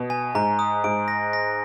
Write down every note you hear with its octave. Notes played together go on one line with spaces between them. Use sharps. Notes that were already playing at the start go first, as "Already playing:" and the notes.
Already playing: B2
G#5
G#2 A#5
D#6
G#2 D7
A#6
A#6